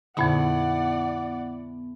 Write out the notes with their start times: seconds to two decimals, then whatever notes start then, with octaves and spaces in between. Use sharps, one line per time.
0.17 F2 A#2 D3 A3 B3 E4 D5 F#5